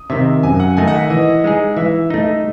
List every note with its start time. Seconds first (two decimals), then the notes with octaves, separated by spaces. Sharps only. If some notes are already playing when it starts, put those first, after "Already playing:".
Already playing: D#6
0.10 C3 D#3 E5
0.43 F#2 G#5
0.60 F#5
0.77 D#3 A3 D#4 G#5
0.88 F#5
0.93 E5
1.10 E3 D#5
1.44 G#3 D#4 G#4
1.77 E3 E5
2.10 A3 D#4 D#5